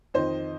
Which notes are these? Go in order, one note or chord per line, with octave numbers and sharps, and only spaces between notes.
F2 D#3 C5 D#5